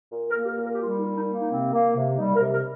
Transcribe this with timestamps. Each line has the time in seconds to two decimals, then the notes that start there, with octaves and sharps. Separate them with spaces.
0.12 A#2
0.28 A#4
0.35 A#3
0.41 G4
0.46 A#4
0.57 A#2
0.63 A#4
0.72 G4
0.81 G3 F4
0.98 D#4
1.03 A#2
1.14 D#4
1.26 A#3
1.40 D#4
1.49 C3 C4
1.72 A#3
1.95 C3
2.18 G3 D#4
2.36 A#4
2.41 C3
2.52 A#4